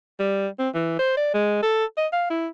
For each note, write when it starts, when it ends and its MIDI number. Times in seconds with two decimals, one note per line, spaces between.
0.20 0.47 55
0.59 0.69 60
0.74 0.99 52
0.99 1.16 72
1.17 1.33 74
1.34 1.60 56
1.63 1.85 69
1.97 2.07 75
2.13 2.27 77
2.30 2.48 64